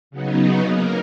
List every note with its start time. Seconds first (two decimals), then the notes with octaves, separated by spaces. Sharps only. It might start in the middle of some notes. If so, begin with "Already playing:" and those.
0.11 C#3 F#3 B3 D#4
0.66 A#3 A#4